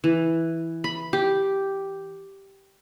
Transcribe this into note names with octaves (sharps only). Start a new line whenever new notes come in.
E3
B5
G4